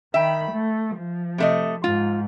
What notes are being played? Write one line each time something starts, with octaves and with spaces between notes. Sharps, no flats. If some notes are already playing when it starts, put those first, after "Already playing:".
D#3 E5 G5 B5
A3
F3
C3 A3 D#5
G#2 F4